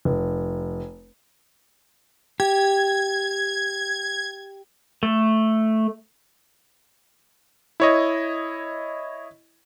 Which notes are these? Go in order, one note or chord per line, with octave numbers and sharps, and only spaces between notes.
F1
G4 G#6
A3
E4 C#5 D#5